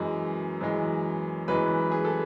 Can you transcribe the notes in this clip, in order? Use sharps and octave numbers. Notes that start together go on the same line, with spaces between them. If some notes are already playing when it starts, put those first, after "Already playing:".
Already playing: F#2 E3 G#3
F#2 E3 G#3
F#2 E3 G#3 B4
G#4
A4